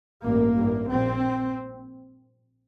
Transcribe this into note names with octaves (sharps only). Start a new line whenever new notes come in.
A1 G2 A#3
A1 G2
A#1 A#2 C4